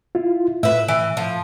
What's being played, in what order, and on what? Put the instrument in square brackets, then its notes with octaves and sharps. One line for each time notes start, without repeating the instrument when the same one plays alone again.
[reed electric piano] E4 F4
[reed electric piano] A2 [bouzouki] B4 E5
[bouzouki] E3
F3